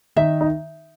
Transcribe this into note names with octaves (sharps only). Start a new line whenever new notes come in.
D#3 D#4 E5
D#4